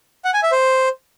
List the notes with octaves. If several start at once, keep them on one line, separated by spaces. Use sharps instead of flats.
F#5
G#5
E5
C5